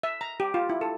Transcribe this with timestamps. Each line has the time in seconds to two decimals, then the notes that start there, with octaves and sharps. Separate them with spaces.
0.03 E5
0.21 A#5
0.40 G4
0.54 F4
0.70 E4
0.81 A4